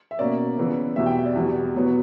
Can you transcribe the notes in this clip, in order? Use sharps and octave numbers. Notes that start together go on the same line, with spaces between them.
E5
B2 A#3 C#4 D5
C#3 E3 B3
E2 B2 G3 E5
G5
E5
D5
E2 B2 G3
B2 F#3 B3